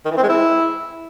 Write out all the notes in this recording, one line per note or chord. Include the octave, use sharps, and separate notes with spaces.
D#3
E3
C4
G#3
E4